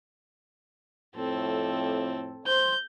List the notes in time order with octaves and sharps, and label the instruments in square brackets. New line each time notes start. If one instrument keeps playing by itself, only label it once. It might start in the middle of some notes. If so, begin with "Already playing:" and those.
[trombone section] F2 A2 [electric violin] C4 A4
[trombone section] C5 [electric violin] G6